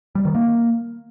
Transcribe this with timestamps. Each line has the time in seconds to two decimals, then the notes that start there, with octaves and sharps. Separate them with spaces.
0.15 G3
0.25 D#3
0.35 A#3